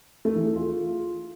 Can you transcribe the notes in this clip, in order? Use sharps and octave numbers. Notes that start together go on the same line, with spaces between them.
A3
E3
G#4
F4